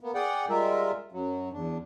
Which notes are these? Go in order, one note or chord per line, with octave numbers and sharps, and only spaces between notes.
A#3 B3
G#4 D5 F#5 G5
G3 G#3 F4 A#4 E5
F#2 F#3
E2 D4